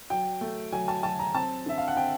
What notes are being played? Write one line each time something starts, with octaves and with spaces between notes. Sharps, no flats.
F#3 G5
A3
F#3 G#5
A5
F#3 A5
A#5
C4 A5
D3 E5
F5
F#5
C4 G5